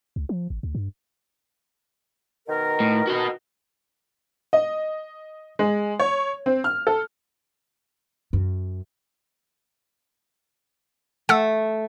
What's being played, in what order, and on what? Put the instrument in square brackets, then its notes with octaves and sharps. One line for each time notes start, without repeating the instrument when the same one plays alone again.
[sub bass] C#2
F3
G#1
D2
G2
[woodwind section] B2 D#3 A#4
[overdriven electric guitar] A2
F#4 D#5
[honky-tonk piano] D#5
G#3
C#5
C4
F6
A4
[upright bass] F#2
[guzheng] A3 [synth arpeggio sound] F#5 E6